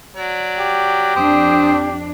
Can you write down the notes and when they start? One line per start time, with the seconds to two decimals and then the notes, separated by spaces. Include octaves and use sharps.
0.16 F#3 D5
0.59 G4
1.16 F2 C4 D4 D#6